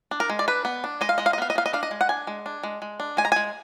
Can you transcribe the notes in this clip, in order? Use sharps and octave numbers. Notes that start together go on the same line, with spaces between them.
D4
A#4
G#3
D5
D4 B4
B3
D4
G#3 D#5
F5
G#3 D#5
F5
D#5
B3 F5
D#5
B3 F5
D#5
D4 F5
D#5
G#3
F#5
D4 G#5
G#3
D4
G#3
G#3
D4
G#3 G#5
A#5
G#3 G#5